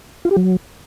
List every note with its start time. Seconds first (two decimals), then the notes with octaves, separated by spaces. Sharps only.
0.25 F4
0.31 G4
0.36 F#3